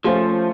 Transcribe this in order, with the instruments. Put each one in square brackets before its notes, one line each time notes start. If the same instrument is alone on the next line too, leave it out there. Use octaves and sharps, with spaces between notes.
[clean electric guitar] F3 [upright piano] A3 C#4 F4 A4 C5